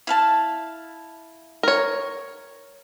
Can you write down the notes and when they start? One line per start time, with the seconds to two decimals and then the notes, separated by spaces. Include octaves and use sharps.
0.07 E4 F5 A5
1.63 A#4 C#5